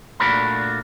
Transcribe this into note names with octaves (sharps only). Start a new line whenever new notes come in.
A#2 A3 D4 F#4 A#4 B5